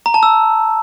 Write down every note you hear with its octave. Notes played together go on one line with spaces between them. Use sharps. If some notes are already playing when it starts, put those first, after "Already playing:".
A#5
A5
E6